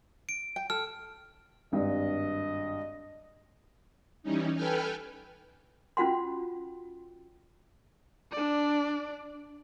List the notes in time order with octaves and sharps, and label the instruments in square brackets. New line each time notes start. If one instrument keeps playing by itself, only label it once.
[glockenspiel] D7
[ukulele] G5
[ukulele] A4 [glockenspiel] F6
[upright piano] G#1 G2 [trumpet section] D#5
[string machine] E3 G3 C#4 D#4
A4 B4 G5 G#5 F6
[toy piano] C#4 F4 F#4 F#5 C6
[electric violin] D4 D5